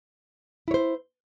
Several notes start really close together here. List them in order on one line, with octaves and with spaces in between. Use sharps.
E4 C#5 C5